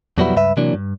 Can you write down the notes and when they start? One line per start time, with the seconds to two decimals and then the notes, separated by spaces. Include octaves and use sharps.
0.18 F2 B2 F#3 G3 B3 E4
0.36 C#2 G2 B4 E5
0.57 C3 E3 F#3 A#3 D4
0.74 G2